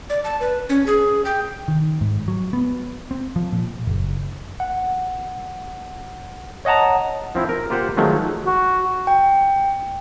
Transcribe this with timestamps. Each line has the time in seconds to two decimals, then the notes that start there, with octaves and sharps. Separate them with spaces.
0.10 D5
0.24 A5
0.40 B4
0.69 C#4
0.86 G#4
1.25 G5
1.68 D#3
2.01 G#2
2.28 F#3
2.53 B3
3.11 C4
3.36 F3
3.52 A#2
3.87 F#1
4.60 F#5
6.65 C#5 D#5 F#5 A5 A#5
7.35 F3 C4 E4
7.49 A#4
7.70 A#3 F4 G4 C5 F#5
7.97 D#3 F3 F#3 G#3 A3
8.46 F#4
9.07 G5